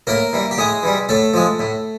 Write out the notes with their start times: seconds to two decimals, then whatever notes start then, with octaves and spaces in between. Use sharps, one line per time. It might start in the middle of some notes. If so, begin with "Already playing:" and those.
0.07 A2 A#3 A#4
0.33 E3 G3
0.51 G4
0.58 A2 G#3 G#4
0.83 E3 G3
1.09 A2 A3 A4
1.34 F3 G#3
1.59 A2